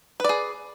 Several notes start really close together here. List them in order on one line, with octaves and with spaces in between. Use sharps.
B4 D5 G#4